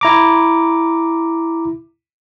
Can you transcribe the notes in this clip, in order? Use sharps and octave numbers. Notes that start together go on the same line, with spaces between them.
E4 A#5 D6